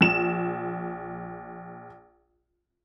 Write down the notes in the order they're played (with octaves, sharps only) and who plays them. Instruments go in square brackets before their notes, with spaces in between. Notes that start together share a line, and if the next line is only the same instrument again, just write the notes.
[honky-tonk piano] A#1 E7